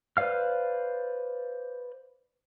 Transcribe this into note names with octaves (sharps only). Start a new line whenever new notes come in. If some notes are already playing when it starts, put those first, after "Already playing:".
B4 C5 D5 F5 F6